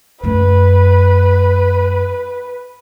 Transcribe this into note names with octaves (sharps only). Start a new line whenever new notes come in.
F#2 A3 B4